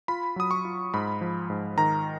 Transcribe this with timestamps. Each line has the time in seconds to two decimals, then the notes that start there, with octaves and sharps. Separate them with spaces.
0.08 F4 B5
0.36 F#3 D#6
0.51 C#6
0.65 F4
0.94 G#2 B5
1.21 F3
1.50 G#2
1.78 D#3 A#5